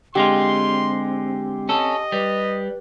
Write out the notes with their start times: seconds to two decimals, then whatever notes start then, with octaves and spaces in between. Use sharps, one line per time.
0.15 D3 G#3 C4 F4 G4 C6
1.69 C#4 A4 D#5
2.12 G3 B4